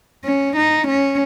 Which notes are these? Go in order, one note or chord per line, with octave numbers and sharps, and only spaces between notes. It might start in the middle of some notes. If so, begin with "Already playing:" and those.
C#4
D#4
C#4